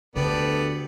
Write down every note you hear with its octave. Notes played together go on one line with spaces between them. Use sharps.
D2 D3 B3 G4 A4 D5